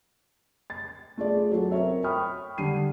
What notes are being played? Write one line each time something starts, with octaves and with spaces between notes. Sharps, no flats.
A6
A3 F4 G#4 D5
F#3 A4
C4 A#4 C#5 E5
G5 B5 C#6 D#6 F6
D3 G3 C7 D#7